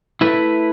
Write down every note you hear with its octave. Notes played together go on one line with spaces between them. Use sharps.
A3 E4 B4